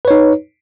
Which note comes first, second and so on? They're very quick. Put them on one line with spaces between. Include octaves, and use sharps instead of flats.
B4 C#5 D#4